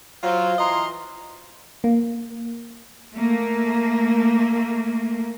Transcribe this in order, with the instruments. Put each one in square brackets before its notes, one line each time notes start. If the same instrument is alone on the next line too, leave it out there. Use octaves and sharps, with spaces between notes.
[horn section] F#3 F4 C5
E3 F4 D#5 A#5 C6
[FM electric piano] A#3
[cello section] A3 A#3